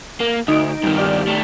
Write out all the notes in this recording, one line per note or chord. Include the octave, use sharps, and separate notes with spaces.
A#3
D2 D#4 D7
G2 D#3
G4 D5 F6
D#3 A3